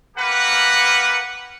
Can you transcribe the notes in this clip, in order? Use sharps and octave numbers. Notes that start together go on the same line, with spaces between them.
A#3 G4 A#4 B4 F#5